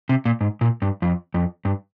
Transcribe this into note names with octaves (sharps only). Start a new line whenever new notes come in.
C3
A#2
G#2
A#2
G2
F2
F2
G2